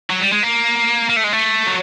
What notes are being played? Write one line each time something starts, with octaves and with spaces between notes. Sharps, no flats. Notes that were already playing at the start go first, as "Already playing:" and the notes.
F#3
G3
G#3
A#3
A#3
A3
G#3
A3
F#3